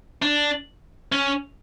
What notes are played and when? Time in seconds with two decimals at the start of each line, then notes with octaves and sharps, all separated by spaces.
0.22 D4
1.12 C#4